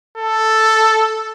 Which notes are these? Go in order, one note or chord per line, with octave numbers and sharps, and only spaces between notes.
A4